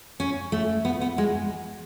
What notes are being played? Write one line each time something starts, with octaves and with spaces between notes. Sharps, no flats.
C#4
A3
B3
B3
G#3